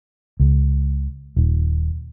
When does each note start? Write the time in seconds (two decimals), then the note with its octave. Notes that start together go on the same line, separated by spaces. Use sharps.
0.40 C#2
1.36 D#1